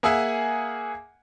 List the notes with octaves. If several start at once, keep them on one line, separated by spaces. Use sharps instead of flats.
A#3 G#4 E5 F#5 G#5